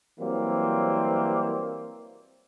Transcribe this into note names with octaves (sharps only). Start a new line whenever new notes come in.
E3 F#3 G3 A#3 C4